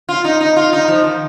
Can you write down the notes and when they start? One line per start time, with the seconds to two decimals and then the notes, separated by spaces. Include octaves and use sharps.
0.09 F4
0.24 D#4
0.41 D#4
0.56 F4
0.73 D#4
0.88 F3
1.04 D#3